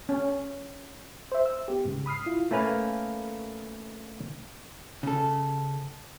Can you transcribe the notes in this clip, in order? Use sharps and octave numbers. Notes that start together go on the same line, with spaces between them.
C#4
C5 E5
E6
B3 G4
G#2 C#3
B5 D#6 F6 C7
E4 F4
A3 A#3 C#4 B4 F5
C#3 A4